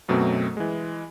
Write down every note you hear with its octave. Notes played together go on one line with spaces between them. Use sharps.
F#2 B2 F#3 A3 C4
E3 G#3